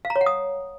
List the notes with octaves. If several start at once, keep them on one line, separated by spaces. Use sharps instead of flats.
F5
A#5
C#5
F#5
D#6